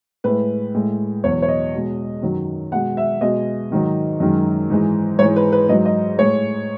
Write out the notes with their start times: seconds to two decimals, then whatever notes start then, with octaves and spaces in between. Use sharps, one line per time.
0.24 A2 G#3 B4
0.74 A2 G#3
1.23 E2 B2 F#3 C#5
1.42 C#5
1.48 D#5
1.73 B2 G#3
2.22 F#2 D#3 F#3
2.72 B2 G#3 F#5
2.97 E5
3.21 B2 G#3 D#5
3.71 G#2 D#3 F#3
4.20 F#2 D#3 G#3
4.70 G#2 E3 G#3
5.19 G#2 C#5
5.22 E3 G#3
5.36 B4
5.52 B4
5.69 G#2 F#3 D#5
5.85 D#5
6.18 A2 G#3 C#5